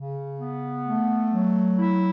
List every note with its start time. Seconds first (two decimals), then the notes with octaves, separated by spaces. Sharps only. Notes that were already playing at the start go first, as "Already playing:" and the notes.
Already playing: C#3
0.39 B3
0.85 A3
1.32 F#3
1.78 E4